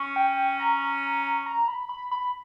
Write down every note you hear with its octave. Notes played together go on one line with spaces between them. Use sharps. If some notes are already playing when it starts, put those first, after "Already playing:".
Already playing: C#4
G5
A#5
A#5
B5
B5
B5